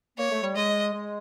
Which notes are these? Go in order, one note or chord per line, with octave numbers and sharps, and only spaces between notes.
A#3 C#5
A3
G3
G#3 D#5
G#3